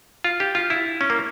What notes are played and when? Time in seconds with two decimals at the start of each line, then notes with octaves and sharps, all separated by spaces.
0.24 F4
0.40 G4
0.55 F4
0.70 E4
1.01 C#4
1.10 A#3